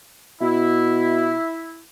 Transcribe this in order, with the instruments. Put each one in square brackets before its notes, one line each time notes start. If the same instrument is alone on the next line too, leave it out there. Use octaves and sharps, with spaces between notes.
[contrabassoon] B2 [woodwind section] E4